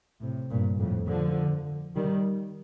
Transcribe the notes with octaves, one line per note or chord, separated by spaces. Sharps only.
A2 C3
G2 A#2
F2 A2
D3 F3
D#3 G3